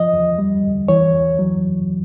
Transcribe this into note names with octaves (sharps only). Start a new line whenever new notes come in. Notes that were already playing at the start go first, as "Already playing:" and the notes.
Already playing: F3 D#5
E2
G3
D2
E3 C#5
E2
F#3